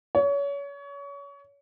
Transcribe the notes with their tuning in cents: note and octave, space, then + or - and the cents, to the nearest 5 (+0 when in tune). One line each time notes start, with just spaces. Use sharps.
C#5 +30